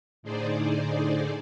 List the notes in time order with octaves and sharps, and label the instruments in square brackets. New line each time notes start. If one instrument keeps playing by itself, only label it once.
[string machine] A2 D3 D#4 G#4 C5 D5